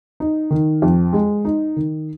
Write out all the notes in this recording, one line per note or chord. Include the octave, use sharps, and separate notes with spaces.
D#4
D#3
F2
G#3
D#4
D#3